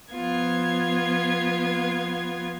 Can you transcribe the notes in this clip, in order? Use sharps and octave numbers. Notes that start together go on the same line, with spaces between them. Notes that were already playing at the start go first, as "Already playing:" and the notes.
F3 B3 F4 G#6